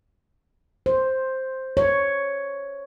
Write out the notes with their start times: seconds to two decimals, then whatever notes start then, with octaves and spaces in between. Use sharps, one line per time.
0.86 C5
1.77 C#5